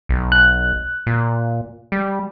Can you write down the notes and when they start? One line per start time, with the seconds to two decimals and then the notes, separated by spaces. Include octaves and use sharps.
0.09 B1
0.32 F#6
1.06 A#2
1.92 G3